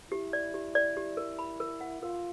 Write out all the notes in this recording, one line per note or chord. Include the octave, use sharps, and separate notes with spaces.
E4 G4
D5
G4
D5
G4
A#4
B5
A#4
F#5
F4 A#4